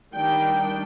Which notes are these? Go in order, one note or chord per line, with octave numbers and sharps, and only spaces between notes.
D#3 G3 D4 G5